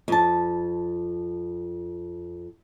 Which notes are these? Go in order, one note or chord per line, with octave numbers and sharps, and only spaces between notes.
F2 A5